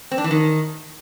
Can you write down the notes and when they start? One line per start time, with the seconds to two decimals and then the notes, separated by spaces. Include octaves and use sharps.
0.11 C4
0.18 D4
0.24 E3
0.31 D#3